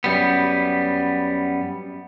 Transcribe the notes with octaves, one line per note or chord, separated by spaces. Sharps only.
F#2 G3 B3